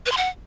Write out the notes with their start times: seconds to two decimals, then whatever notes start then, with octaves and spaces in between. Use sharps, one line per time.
0.06 B4
0.12 C6
0.17 F#5